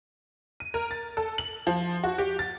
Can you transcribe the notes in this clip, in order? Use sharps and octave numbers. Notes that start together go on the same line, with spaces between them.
D#7
A#4
A6
A4
F#7
F3
F#4
G4
A6